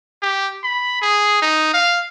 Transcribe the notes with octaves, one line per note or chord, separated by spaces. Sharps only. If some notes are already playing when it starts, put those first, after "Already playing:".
G4
B5
G#4
D#4
F5